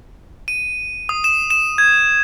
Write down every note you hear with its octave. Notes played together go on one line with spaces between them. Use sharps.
D#7
D#6
E7
E7
G#6